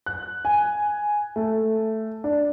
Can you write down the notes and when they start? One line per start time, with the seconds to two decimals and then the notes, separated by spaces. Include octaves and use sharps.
0.06 F#6
0.45 G#5
1.36 A3
2.24 D4